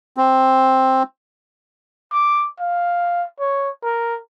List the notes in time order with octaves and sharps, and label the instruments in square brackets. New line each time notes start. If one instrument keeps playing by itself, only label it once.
[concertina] C4
[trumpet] D6
F5
C#5
A#4